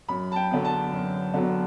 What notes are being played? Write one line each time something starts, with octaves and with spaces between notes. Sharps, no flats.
F#2 B5
A5
G5
D3 F#3 B3
A5
F#2
D3 F#3 B3